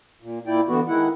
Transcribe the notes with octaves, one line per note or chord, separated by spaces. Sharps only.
A#2
A#2 E4 D5 G5
D3 E3 B3 F#4
D#3 G#3 E4 F#5